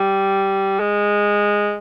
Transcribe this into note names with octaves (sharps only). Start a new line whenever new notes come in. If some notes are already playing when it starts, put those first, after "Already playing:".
Already playing: G3
G#3